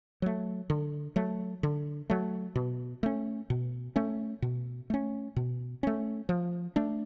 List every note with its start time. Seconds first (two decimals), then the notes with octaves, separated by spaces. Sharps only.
0.22 F#3 A3
0.70 D3
1.16 F#3 A3
1.63 D3
2.10 F#3 A3
2.55 B2
3.03 A3 C#4
3.50 B2
3.96 A3 C#4
4.42 B2
4.90 A3 C#4
5.36 B2
5.83 A3 C#4
6.29 F3
6.76 A3 D4